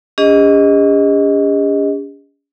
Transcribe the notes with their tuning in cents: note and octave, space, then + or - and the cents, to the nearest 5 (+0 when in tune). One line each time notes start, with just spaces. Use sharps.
C#4 +40 G#4 -45 D#5 +0